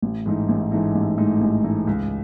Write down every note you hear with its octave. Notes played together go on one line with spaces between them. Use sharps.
A1
G#2 E3 A3 D#4
A1
G#2 E3 A3 D#4
A1
G#2 E3 A3 D#4
A1
G#2 E3 A3 D#4
C#2